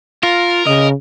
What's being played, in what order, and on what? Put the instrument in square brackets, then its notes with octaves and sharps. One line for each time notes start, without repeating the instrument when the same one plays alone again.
[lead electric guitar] F4 [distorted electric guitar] A#4
[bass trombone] C#3 [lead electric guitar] D#5